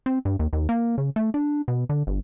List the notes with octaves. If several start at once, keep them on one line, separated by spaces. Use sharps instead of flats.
C4
G2
D#2
D#2
A#3
C#3
A3
D4
B2
D3
G1